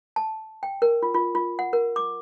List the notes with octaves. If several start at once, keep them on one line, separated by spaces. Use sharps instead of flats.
A5
G5
A#4
F4
F4
F4
F#5
A#4
D6